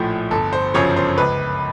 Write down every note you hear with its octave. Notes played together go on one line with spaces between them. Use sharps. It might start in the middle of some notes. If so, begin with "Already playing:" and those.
Already playing: A#1 A2 F3
G1 A4
C5
F#2 C#3 F3 C#5
C5
C#2 B4